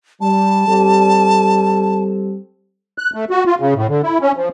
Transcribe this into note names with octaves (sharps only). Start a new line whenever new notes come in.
G3 A5
G3 C4 A4
F#6
A3
F#4
F4
C#3
A2
D3
E4
C#4
F3